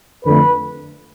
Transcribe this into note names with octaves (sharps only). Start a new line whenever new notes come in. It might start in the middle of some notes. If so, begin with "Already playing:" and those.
F2 D3 A3 B4